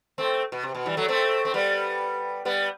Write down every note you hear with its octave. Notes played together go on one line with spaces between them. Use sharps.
A3 C4
B2
C3
B2
E3 G3
F#3 A3
A3 C4
C4
G3 B3
G3 B3